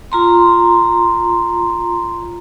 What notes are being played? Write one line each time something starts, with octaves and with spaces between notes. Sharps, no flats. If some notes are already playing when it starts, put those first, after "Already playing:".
F4 A#5 C6